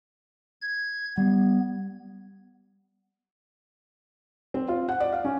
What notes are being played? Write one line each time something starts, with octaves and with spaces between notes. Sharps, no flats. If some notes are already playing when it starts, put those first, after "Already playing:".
G#6
G3 B3
C4
F4
F#5
D5
F5
C#4